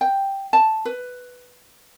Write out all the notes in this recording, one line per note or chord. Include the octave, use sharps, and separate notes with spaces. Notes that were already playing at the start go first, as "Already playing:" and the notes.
G5
A5
B4